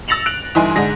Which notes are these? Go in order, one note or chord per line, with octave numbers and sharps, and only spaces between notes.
E6 A6 A#6 C#7 F7 F#7
F#6 D7 F7 F#7
G1 E3 D#4 E5 G#5 C6
G#2 D3 G#4 A#6